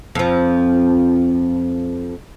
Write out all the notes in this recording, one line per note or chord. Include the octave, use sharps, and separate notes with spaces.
F2 F3